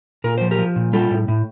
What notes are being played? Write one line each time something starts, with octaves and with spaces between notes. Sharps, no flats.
A#2 A#4
F3 C5
G4 A#4
F3
A#2
G3 F4 A4
A2
A2